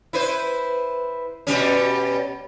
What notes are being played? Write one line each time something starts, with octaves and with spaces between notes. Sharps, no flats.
E4 B4 C5
B2 G3 C#4